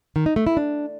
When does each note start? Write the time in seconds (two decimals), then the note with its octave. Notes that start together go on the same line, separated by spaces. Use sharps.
0.16 D#3
0.26 D#4
0.36 A3
0.47 E4
0.57 D4